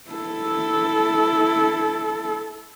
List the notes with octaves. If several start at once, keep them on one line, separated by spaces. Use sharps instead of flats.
E4 A4